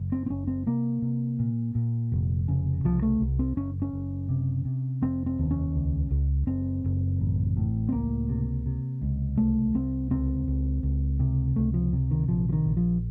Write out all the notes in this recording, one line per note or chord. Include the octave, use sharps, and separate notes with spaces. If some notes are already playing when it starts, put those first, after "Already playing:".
Already playing: F#1
C4
C4
F#1 C#4
C4
C3 A#3
C3
A#2
A#2
F1
C#3
C2 F3
A3
C2
C4
F#1 C#4
C#4
F#1
C3
C3
F1 C4
C4
D#2
C#4
C#2
C#2
F#1 C4
F#1
A1
A2
C4
C#2 A#3
C3
C3
C#2
C2 A3
C2 C4
C#2 C4
C#2
C#2
C3
C#2 A3
F3
C3
D#3
A#1 F3
F3
D#3
A#1
F3